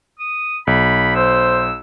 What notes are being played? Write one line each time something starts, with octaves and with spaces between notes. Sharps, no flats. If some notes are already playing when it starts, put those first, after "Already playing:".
D#6
B1 B5
C5 E6